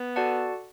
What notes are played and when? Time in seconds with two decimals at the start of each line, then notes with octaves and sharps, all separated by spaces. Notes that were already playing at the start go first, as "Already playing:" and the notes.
Already playing: B3
0.16 F#4 A4 D5 F#5 A5